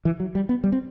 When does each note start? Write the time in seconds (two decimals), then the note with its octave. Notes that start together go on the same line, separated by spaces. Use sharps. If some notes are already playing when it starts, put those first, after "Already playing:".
0.05 E3
0.20 F#3
0.35 G3
0.49 B3
0.64 G3
0.72 C4